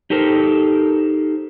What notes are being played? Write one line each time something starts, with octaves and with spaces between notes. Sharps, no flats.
D#4 G4 A4 A#4 C5